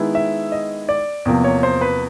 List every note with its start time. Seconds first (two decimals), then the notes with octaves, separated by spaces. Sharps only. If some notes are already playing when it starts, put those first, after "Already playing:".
Already playing: D#3 G#3 B3 E4
0.15 E5
0.52 D#5
0.89 D5
1.25 E2 C3 F3 A#3
1.44 C#5
1.63 C5
1.81 B4